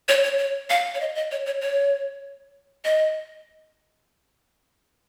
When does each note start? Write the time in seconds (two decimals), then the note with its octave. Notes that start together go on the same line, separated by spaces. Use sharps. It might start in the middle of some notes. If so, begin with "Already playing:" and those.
0.08 C#5
0.24 C#5
0.38 C#5
0.70 F5
0.95 C#5
1.00 D#5
1.15 D#5
1.31 C#5
1.46 C#5
1.61 C#5
2.85 D#5